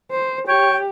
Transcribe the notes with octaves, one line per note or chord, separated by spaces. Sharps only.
C5
G4 C#5 G5